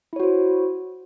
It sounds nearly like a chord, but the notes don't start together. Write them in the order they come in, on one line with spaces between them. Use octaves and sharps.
E4 C#5 F#4 C5